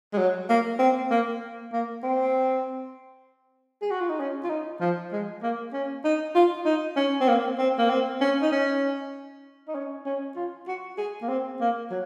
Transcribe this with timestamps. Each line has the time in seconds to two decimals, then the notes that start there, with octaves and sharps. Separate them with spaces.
0.13 G#3
0.18 F#3
0.49 A#3
0.79 C4
1.11 A#3
1.72 A#3
2.03 C4
3.82 G#4
3.91 F#4
4.00 F4
4.09 D#4
4.20 C#4
4.44 F4
4.49 D#4
4.81 F3
5.12 G#3
5.43 A#3
5.73 C#4
6.04 D#4
6.35 F4
6.65 D#4
6.96 C#4
7.21 C4
7.28 A#3
7.59 C4
7.78 A#3
7.90 C4
8.21 C#4
8.42 D#4
8.52 C#4
9.68 D#4
9.75 C#4
10.06 C#4
10.36 F4
10.67 F#4
10.98 G#4
11.22 A#3
11.29 C4
11.60 A#3
11.90 F#3